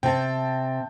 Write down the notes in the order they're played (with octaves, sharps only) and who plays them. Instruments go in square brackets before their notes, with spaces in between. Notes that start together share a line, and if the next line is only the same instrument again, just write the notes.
[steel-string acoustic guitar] C3 [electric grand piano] G5 A5